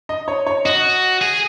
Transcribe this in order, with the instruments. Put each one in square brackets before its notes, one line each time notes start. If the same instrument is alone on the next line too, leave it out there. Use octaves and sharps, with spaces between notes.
[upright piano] D#5
C#5
C#5
[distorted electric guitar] F#4 [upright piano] D#5
[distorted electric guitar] G#4